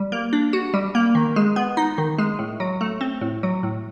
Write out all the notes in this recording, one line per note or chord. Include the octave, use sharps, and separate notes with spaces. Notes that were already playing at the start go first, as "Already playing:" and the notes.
Already playing: G3
A#3
D4
F#4
G3
A#3
D#3
G#3
B3
D#4
D#3
G#3
A2
F#3
A3
C4
A2
F#3
A2